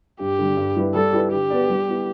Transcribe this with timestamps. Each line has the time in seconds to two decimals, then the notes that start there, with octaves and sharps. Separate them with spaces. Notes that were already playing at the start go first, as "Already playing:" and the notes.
0.20 G2 G4
0.39 D3 G3
0.57 G2
0.76 G3 E4 B4
0.94 G3 A4
1.13 E4 G4 B4 D5
1.32 D3 G4
1.50 B3 D4 B4 D5
1.70 G3
1.88 B3 E4